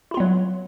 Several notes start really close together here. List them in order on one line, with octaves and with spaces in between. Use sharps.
E4 F4 B3 F#3